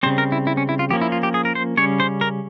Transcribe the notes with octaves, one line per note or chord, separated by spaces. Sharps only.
C#3 G3 C4 C5
A#4
E4
E4
C#4
E4
F4
F3 A#3 C#4 G4
E4
F4
G4
G#4
A#4
C5
C#3 G3 C#4 C#5
C5
A#4